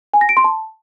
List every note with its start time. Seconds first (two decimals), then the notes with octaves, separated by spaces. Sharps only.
0.14 G#5
0.21 A#6
0.29 D7
0.37 C6
0.44 A5